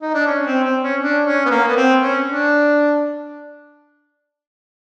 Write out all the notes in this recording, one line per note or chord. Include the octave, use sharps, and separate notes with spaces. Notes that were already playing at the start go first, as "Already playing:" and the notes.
D#4
D4
C#4
C4
C4
C#4
D4
C#4
B3
A#3
B3
C4
C#4
D4